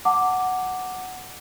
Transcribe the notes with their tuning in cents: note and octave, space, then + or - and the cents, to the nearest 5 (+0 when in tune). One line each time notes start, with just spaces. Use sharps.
F#5 +0 A5 +25 D6 +0